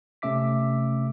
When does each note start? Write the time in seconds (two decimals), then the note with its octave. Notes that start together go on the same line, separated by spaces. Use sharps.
0.22 C3 A3 C#4 E5 D6 B6